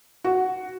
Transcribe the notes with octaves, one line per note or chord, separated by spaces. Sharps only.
F#4